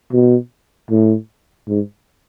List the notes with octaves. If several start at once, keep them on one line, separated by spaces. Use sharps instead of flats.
B2
A2
G#2